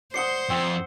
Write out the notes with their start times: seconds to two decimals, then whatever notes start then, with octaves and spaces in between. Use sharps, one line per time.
0.14 C5 D5 F#5 D#6 C7 C#7 G7
0.50 F2 C4